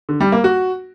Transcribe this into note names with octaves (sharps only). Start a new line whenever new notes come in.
D3
G3
A#3
F#4